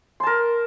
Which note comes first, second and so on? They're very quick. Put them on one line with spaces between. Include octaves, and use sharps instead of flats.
C6 A5 A#4